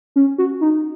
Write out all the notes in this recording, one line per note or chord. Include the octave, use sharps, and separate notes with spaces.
C#4
F#4
D#4